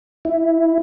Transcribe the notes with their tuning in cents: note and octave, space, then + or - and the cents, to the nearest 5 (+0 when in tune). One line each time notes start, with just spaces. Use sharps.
E4 +0